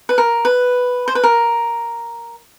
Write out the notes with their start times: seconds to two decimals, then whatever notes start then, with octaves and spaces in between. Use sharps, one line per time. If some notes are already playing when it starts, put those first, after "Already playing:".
0.09 B4
0.18 A#4
0.45 B4
1.08 C5
1.15 B4
1.23 A#4